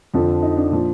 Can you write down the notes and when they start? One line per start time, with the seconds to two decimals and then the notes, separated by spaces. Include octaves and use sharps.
0.14 F2 D3 F3
0.42 D#4
0.57 D4
0.71 A#2 F3